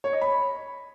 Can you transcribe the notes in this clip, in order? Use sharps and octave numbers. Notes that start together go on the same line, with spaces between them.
C#5
D#5
B5